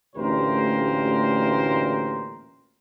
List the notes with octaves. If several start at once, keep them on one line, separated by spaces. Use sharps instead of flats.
A1 D2 A#2 G4 A#4 C5